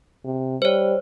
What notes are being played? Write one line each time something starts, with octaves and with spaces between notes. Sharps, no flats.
C3
G3 C5 C#5